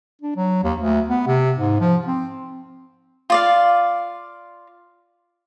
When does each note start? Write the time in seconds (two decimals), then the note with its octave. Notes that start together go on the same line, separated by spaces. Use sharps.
0.22 D4
0.36 F#3
0.64 D#2
0.79 D2
1.09 B3
1.27 C3
1.58 G#2
1.80 F3
2.07 C4
3.30 F4 D5 F5